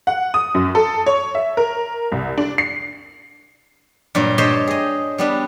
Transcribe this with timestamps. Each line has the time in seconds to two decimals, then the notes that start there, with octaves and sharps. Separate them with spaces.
0.07 F#5
0.34 D#6
0.55 F#2
0.75 A4
1.06 C#5
1.35 E5
1.57 A#4
2.12 C2
2.38 D4
2.58 C7
4.15 G2 A#2 F#3
4.38 G4 C5 C#5 D#5 G5 A5
4.67 G#4 D#5
5.18 G3 B3 D4